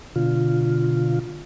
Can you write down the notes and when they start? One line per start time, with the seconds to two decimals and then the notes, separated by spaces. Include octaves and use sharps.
0.16 B2 D3 F4